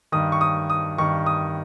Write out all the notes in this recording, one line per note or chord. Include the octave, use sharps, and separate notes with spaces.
G2 D#3 D#6
C#6
D#6
D#6
G2 D#3 C#6
D#6